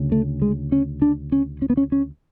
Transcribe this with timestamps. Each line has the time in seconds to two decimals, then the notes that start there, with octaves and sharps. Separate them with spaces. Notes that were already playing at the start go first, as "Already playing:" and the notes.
Already playing: D2 C#3
0.12 A3
0.42 G#3
0.72 C#4
1.02 D4
1.32 C#4
1.62 C#4
1.70 B3
1.77 C#4
1.92 C#4